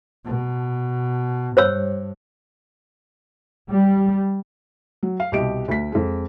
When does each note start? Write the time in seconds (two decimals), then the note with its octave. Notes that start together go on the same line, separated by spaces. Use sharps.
0.25 B2
1.57 G2 C5 C#5 E6
3.70 G3
5.03 F#3
5.20 F5
5.32 C2 B2 G4 D#5 D7
5.68 D2 B6
5.92 F2 G#3